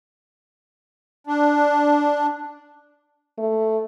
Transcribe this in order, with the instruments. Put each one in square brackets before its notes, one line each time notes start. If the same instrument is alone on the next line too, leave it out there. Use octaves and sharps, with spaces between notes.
[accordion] D4
[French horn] A3